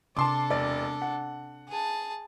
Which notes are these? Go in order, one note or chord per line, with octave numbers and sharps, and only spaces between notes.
C3 D4 A4 A5 C6 D6
E1 D5
F#5
G#4 A5